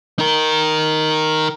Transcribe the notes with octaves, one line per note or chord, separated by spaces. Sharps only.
D#4 A#4